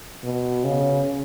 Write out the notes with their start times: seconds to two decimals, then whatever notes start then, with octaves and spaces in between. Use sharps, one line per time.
0.24 B2
0.65 C#3